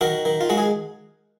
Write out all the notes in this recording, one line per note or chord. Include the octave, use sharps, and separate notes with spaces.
D#3 F#4 A#4
D#3
F4
G#3 F#4
G#4